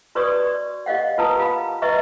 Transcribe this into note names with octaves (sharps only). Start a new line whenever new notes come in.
F#4 B4 C#5 D5 C#6 D#6
D5
G4 D#5 F5 F#5
F4 A#4 B4 A5 A#5 D#6
G4 F5 B5
B4 D#5 E5 A#5 C#6